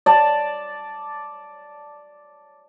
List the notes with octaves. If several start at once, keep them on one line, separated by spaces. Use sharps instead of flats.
D5 A5